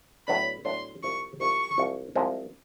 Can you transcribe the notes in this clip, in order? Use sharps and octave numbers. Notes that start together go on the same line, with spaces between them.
A2 F#3 B3 D4 B5
A2 F#3 B3 D4 C6
C2 C3 F3 G#3 C4 C#6
C2 C3 F3 G#3 C4 C#6
C2 C3 F3 G#3 C4
C2 C3 F3 G#3 C4